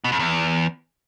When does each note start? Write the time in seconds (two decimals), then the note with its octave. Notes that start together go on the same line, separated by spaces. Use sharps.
0.04 B2
0.12 F2
0.19 E2